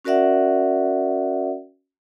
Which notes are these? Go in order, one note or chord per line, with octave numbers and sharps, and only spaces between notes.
C#4 F#4 A#4 D5 E5 F#5